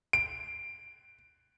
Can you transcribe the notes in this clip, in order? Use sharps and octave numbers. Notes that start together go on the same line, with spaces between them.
D7